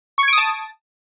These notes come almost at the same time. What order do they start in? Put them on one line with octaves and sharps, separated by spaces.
C#6 G#6 D7 D#6 A5